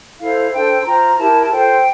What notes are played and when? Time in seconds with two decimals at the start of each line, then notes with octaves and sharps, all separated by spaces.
0.20 E4 A4 C5 F5
0.53 D4 A4 C5 G5
0.81 C6
0.85 F4 C5 A#5
1.18 E4 G4 A#4 A5
1.41 A5
1.51 F4 A4 C5 G5